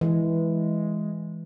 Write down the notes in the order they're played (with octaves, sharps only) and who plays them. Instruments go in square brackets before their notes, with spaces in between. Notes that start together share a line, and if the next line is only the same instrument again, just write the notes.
[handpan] E3 [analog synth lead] G#3